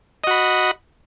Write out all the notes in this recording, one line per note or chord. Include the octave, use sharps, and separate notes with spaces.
F#4 D#5 B5